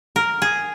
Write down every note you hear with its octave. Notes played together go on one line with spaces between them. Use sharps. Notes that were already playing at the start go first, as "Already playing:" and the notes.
A#4
G#4